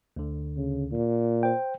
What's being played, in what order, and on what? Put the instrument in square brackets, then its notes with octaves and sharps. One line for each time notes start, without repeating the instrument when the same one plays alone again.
[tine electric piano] D2 D3
[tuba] C#3
A#2
[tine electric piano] C5 G5